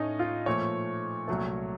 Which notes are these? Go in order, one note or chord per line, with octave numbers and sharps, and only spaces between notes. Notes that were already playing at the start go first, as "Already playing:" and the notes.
Already playing: A2 A3 C#4 D#4
F4
A#2 F3 A3 C#5
C2 A#2 F#3 A3